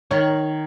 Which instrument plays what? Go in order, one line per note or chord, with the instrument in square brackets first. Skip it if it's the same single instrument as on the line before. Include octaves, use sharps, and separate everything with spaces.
[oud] D#3 [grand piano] C#5